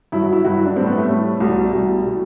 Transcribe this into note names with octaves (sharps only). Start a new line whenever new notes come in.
G2 F#3 E4
F#4
E4
G2 F#3 F#4
E4
D4
A2 G3 C4
B3
A3
A2 G3
C2 B2 G3 A3
C2 B2 G3
B2 G3